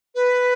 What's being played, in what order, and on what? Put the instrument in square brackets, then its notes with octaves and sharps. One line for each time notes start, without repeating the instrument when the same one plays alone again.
[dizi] B4